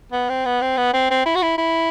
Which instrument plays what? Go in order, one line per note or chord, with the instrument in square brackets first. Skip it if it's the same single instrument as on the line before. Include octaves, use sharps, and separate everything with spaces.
[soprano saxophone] B3
C4
B3
C4
B3
C4
C4
E4
F#4
E4
E4